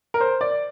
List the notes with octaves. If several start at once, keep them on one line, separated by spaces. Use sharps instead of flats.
A#4
C5
D5